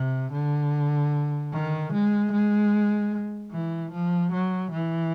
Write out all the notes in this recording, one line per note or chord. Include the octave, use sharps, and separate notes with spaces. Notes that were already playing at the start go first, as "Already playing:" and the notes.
Already playing: C3
D3
D#3
G#3
G#3
E3
F3
F#3
E3